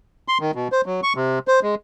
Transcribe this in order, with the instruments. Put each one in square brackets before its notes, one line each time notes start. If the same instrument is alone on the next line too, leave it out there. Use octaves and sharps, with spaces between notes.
[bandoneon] C6
D#3
B2
C5
F#3
C#6
C3
C5
G#3